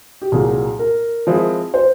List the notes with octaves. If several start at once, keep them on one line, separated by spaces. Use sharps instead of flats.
G4
C2 A#2 F#3 G#4
A#4
F3 G#3 C4 E4
C5